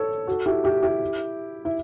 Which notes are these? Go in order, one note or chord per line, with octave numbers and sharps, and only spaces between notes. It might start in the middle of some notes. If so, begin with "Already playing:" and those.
Already playing: A4 C#5
F#4 A4
E4 G4
E4 G4
E4 G4
E4